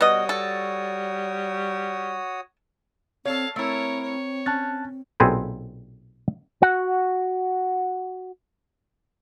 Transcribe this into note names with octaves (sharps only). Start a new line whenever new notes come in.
B2 G3 F#4 C#5 D#5 D#6
A4
C4 A4 C#5 F5 A5
A3 C4 E4 A#4 C#5
C#5
C#4 A5 F#6 A6
B1 A#2 C4 G#4 A4 B4
F#4 F#5